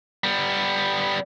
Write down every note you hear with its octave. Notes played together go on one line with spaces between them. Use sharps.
G3 B3